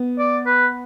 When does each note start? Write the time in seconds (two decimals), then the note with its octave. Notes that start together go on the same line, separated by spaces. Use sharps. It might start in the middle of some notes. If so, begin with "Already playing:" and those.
Already playing: B3
0.18 D5
0.46 B4